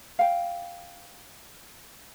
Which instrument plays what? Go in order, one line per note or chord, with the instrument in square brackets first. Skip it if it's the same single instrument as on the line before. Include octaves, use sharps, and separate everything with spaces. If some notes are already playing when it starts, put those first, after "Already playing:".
[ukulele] F5 G5